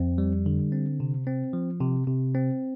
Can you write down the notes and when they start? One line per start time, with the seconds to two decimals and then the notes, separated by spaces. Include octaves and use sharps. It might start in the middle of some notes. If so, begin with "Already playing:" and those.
Already playing: F2 C4
0.18 G3
0.46 D3
0.72 C4
1.00 C3
1.27 C4
1.53 F3
1.80 C3
2.07 C3
2.35 C4